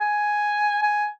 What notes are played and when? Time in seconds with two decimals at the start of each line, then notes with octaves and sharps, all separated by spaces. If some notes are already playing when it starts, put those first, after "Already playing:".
0.01 G#5
0.82 G#5